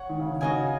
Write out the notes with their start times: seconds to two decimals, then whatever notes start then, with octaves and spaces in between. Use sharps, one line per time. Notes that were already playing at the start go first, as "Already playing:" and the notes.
Already playing: C#5 F#5
0.09 D#3
0.20 C#3
0.31 D#3
0.41 C#3 F#4 D#5 G#5